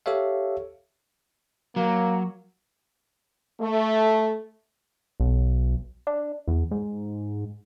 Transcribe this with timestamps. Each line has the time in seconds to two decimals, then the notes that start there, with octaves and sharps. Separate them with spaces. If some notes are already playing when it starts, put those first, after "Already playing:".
0.06 G4 A4 C#5 E5 F5
1.76 F#3 A#3
3.60 A3
5.20 B1
6.07 D4
6.48 E2
6.71 G#2